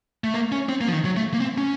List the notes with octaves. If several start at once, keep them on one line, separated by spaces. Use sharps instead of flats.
A3
A#3
C#4
C4
A#3
F3
D#3
F#3
A3
A#3
C4
C#4